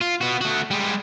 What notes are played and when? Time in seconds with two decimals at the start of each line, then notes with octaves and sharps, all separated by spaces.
0.01 F4
0.21 B3 F#4
0.41 A3 F#4
0.71 G3 G#3